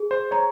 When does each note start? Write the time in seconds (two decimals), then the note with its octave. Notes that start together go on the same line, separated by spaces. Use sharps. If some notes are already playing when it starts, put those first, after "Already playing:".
Already playing: G#4
0.11 C5
0.31 C#5 A#5